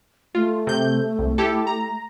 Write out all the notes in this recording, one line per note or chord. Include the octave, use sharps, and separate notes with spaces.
A3 F4
C3 G6
C2
E4 G4 A4
A#5